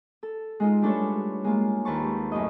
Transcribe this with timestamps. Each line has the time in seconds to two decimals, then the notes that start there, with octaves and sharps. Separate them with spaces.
0.23 A4
0.60 G#3 D#4 F4
0.82 G3 A3 D4 A4 B4 C#5
1.44 G#3 A#3 F4
1.85 D#2 B4 C5 A5 C#6
2.32 F#2 A2 D#5